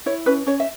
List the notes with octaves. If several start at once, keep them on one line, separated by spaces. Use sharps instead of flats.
E4 C#5
C#4 B4
C#4 C#5
E5